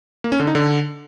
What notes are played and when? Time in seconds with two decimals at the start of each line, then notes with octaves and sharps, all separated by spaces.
0.24 A#3
0.32 C#4
0.40 D3
0.47 D#4
0.55 D3